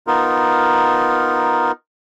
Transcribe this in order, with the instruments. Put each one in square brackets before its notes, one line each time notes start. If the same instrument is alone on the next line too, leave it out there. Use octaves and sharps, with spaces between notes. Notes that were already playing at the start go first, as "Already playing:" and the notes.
[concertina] B3 D#4 F4 A#4